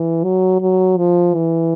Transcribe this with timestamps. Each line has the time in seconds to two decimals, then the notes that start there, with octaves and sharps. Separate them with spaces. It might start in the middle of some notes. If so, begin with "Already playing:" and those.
Already playing: E3
0.24 F#3
0.61 F#3
0.97 F3
1.35 E3